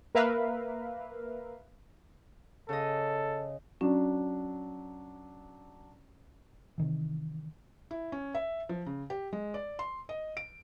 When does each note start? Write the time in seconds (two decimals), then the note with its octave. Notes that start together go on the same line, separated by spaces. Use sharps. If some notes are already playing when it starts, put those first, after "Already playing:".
0.15 A#3 A#4 B4 E5 F5
2.69 C#3 A4 D#5
3.81 F#3 C#4 D4
6.78 C3 D#3 E3
7.91 E4
8.12 C#4
8.35 E5
8.69 F3
8.86 C#3
9.10 G4
9.33 G#3
9.54 D5
9.79 C6
10.09 D#5
10.37 D7